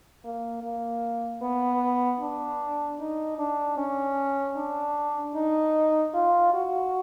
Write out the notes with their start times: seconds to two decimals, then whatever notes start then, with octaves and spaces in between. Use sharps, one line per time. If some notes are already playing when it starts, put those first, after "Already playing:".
0.24 A#3
0.63 A#3
1.42 B3
2.20 D4
3.00 D#4
3.39 D4
3.77 C#4
4.56 D4
5.35 D#4
6.14 F4
6.54 F#4